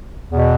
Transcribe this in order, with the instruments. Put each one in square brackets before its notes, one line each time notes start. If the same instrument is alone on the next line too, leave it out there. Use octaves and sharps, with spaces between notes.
[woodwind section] E2 B2